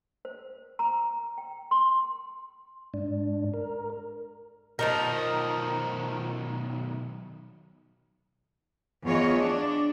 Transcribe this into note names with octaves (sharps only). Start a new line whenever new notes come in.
C5
A#5
G5
C6
G#2 D4
A#4
B1 D#3 F3 D#4 A#4
E2 F4 C#5 D#5
D4